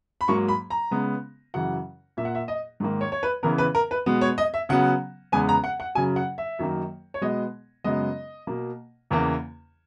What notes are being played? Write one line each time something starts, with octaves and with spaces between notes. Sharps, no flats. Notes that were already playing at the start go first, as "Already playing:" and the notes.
B5
G#2 F#3 A#3 C#6
B5
A#5
C#3 G#3 B3
F#2 C#3 E3 F#5
A#2 A#3 E5
F#5
E5
D#5
G#2 D#3 A#3
C#5
C#5
B4
C#3 E3 B3 A#4
B4
A#4
B4
B2 G#3 B3
C#5
D#5
E5
C#3 F#3 B3 F#5
E2 C#3 G#3 B3 G#5
A#5
F#5
F#5
F#2 C#3 F#3 G#5
F#5
E5
F#2 D#3 F#3 A#3
C#5
B2 G#3 B3 D#5
F#2 C#3 G#3 B3 D#5
B2 A#3
E2 C#3 E3 A#3